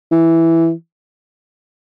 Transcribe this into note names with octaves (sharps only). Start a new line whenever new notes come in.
E3